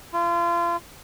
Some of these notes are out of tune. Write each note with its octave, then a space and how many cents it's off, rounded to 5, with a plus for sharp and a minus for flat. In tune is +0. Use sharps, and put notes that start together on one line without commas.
F4 -30